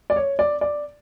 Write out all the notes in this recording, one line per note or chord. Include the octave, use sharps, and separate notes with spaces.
D5
C#5
D5
D5